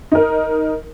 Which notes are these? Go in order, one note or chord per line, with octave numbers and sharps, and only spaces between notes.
D#4 A#4